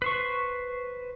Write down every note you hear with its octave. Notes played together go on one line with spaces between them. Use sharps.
B4 C5 C#6